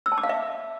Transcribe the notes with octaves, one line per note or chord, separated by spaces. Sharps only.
E6
A5
D6
F5
E5